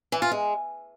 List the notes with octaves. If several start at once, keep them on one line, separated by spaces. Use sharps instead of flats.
E3
F4
G#3